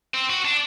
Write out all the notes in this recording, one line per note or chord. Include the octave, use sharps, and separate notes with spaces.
C4
F#4
D4